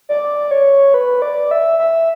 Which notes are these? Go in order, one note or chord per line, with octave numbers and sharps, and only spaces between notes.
D5
C#5
B4
D5
E5
E5